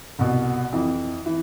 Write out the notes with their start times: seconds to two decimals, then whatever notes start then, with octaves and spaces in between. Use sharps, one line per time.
0.19 C2 B2
0.72 F2 E3
1.26 E3